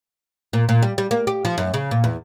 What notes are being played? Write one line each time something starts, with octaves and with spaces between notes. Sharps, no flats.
A#2
A#2
G3
G3
A#3
G4
F3
F#2
C#3
A#2
E2